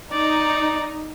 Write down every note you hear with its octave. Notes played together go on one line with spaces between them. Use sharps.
D#4 D5